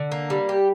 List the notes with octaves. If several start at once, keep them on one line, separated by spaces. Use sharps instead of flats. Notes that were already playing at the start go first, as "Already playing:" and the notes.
Already playing: D3
A#3
G3
G4